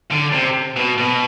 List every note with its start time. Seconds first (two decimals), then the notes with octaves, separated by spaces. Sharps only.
0.11 D3
0.32 C3
0.76 B2
0.98 B2